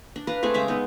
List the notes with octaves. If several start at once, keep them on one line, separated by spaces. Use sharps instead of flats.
D4
B4 F5 A#5
A3 C4 G#4 G#5
C#3 G#3 E5 D6
B3 D#4